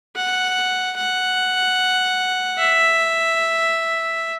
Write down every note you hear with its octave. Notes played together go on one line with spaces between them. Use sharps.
F#5
F#5
E5